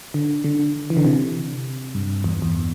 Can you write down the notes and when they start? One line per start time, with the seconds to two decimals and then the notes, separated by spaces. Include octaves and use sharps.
0.14 D3
0.44 D3
0.90 E3
0.97 D3
1.05 C3
1.95 G2
2.24 E2
2.42 E2